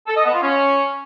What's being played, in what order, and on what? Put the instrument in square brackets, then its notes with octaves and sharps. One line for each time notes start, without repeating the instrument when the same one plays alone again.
[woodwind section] A4
D#5
B3
F4
C#4